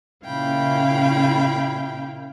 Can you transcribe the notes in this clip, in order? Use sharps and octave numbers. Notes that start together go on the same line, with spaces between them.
A#2 C#3 E4 F5 G5 B5